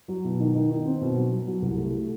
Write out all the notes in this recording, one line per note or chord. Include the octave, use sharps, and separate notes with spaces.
F#3
B2
D#3
D#3
D#3
C4
B2
F#3
F#3
F#3
C2
A3
A3